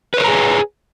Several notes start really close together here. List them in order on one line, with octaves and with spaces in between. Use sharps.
B4 C#5 A#4 A#5 G#4